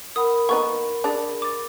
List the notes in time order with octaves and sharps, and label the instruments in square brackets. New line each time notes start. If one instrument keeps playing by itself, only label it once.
[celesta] A#4 F#5 B5 [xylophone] D#6
[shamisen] A#3 B3 D#4 [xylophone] C#6
[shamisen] D4 [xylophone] G#4 D5
[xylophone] D6 A6